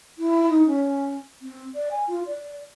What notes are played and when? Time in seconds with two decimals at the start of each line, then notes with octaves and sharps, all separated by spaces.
0.18 E4
0.49 D#4
0.66 C#4
1.41 C4
1.74 D5
1.91 G#5
2.07 F4
2.26 D5